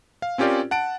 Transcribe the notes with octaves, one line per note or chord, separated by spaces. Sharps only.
F5
C4 C#4 F4 G4 A#4 D5
F#5 A5 D7